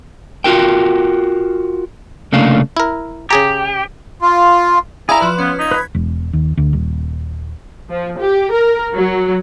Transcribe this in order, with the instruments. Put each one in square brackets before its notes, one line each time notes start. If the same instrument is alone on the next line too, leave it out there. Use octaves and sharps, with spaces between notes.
[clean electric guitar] F4 F#4 A#4 G5
C2 C#3 A3 A#3 D4 F5
[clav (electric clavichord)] E4 A#4
[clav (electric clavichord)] C#3 G#4 A#5 [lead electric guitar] G4
[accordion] F4
[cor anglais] E4 [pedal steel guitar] G#4 A#5 [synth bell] D5 F5
[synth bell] F3 F#7 [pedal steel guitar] B4
[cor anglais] B3 [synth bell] C#4
[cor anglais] D#4 [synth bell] G#6 B6
[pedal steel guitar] B4 B5
[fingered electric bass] E1
D#2
D2
D#1
[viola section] F3
G4
A#4
F#3